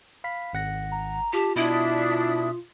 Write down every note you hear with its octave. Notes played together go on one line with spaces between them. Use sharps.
F5 B5 B6
G#1 F#5 A#6
A#5
F4 G4 A5
B2 D4 E4 E5 D#6